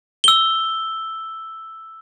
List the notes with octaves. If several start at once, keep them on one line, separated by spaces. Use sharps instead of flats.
E6 G7